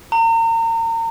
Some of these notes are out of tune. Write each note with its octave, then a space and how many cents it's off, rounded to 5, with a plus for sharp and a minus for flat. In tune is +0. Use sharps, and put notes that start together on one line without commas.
A#5 -35